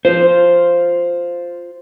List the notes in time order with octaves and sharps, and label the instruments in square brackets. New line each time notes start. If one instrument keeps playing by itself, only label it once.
[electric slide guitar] F4 C5